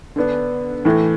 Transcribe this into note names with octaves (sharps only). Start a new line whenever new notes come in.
D3 B3 D4
A2 E3 A3